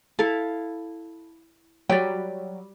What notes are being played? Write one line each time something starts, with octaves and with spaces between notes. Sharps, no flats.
E4 A4 F5
F#3 G3 B4 D5 G5